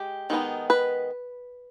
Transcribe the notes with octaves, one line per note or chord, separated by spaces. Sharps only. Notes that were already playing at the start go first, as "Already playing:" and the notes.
Already playing: G#3 G4
D#3 G#3 B3 D#4
B4